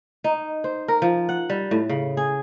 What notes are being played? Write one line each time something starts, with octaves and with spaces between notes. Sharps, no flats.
D#4
C5
A#4
F3
F#5
G3
A2
C#3
G#4